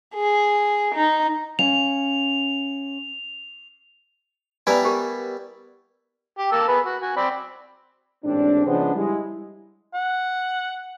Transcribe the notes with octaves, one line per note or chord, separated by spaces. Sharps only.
G#4
D#4
C#4 F5 F7
G3 B3 E4 G#5 A#5 B5
G4 A#4
G4
A#3 A5 E6
B3 G#4 B4
F#4
F#4 G#5
C4 D5 B5
A1 G#2 C4 D4
C#3 F3 G#3 B3 D4 C5
G3 G#3 E4
F#5